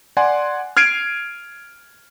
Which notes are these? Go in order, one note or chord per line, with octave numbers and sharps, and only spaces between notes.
D5 F#5 G#5 C6
F6 G#6 C7 D7 D#7